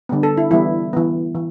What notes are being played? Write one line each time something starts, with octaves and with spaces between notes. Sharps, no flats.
D3 G3 B3
A4
E4
E3 G3 B3 E4
E3 B3
E3